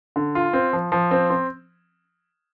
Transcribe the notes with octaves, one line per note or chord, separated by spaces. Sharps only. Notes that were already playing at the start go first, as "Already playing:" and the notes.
D3
F4
C4
F3
F3
C4
C4